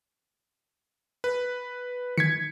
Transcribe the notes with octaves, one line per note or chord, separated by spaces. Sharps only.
B4
D#3 G#6 B6 C#7